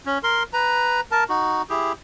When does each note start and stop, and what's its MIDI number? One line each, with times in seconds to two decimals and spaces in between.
0.06 0.18 61
0.23 0.43 70
0.23 0.43 84
0.53 1.01 71
0.53 1.01 82
1.11 1.24 70
1.11 1.24 81
1.29 1.62 63
1.29 1.62 66
1.70 1.93 64
1.70 1.93 67
1.70 1.93 68